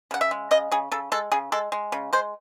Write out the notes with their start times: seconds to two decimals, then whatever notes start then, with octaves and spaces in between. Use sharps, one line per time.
0.11 C#3 F#5
0.21 E5
0.31 G#3
0.51 C#3 D#5
0.72 C#3 G#4
0.91 C#3 A4
1.12 G#3 A4
1.32 C#3 G#4
1.52 G#3 A4
1.72 G#3
1.92 C#3
2.13 G#3 C5